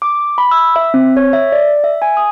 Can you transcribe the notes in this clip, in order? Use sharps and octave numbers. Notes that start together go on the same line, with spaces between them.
D6
B5
E6
E5
C4
C#5
E5
D5
E5
G#5
D#6